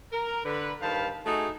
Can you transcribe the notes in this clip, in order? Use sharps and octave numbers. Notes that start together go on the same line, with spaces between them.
A#4
D3 B4
G2 D#3 C5 F5 A5 B5
A3 D#4 F#4 G#4